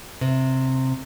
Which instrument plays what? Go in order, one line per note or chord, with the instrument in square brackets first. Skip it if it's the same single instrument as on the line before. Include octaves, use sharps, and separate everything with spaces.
[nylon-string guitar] C3